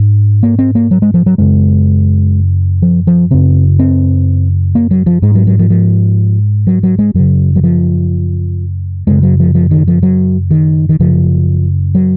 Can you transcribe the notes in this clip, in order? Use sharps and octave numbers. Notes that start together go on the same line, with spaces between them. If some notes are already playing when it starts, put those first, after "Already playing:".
Already playing: G#2
A#3
C4
A#3
F#3
G#3
F3
F#3
F#2 C#3 G#3
F3
F3
F#2 C#3 C4
C4
A#3
F#3
F3
G#2 G#3
F#3
F#3
F3
F3
F#3
F#3
G#3
F#2 C#3 F#3
F#3
F3
F#2 C#3 G#3
F#3
F3
F3
D#3
F3
F#3
D#3
D#3
F#2 C#3 F3
F#3